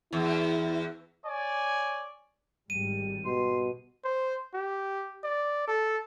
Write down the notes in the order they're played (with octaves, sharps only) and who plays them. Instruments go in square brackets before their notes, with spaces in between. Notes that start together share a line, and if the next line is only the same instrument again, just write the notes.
[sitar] E2 [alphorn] E4
[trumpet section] C#5 D5 G#5
[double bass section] G#1 G3 [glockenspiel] D#7
[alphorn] B2 [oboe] C6
[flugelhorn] C5
G4
D5
A4